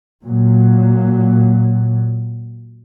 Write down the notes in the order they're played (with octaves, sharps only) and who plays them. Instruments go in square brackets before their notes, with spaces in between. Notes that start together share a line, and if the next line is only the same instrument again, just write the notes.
[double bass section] A#2 F#3